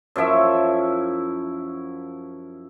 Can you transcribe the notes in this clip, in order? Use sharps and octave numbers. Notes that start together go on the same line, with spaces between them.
F#2 F3 E4 E5